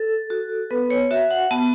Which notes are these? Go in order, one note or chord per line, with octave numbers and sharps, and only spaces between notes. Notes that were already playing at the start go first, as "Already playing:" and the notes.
Already playing: A4
F#4
B3 B4
C#5
F#4 E5
F#5
B3 A5